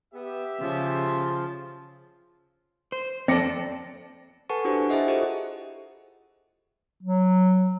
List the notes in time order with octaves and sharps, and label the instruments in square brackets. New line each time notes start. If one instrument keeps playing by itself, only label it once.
[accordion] B3 [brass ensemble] G4 E5
[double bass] C#3 [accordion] F3 [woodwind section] F4
[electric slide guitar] C5
[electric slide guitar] F2 A4 [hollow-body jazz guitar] C4 [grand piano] D5 A#6 C#7
[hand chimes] A4 B4 F#5 G#5 A5 C#6
D4 E4 F#4 G4 C5 G#5
E4 G#4 C5 D#5 E5 F#5
F4 G4 A4 C5
[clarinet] F#3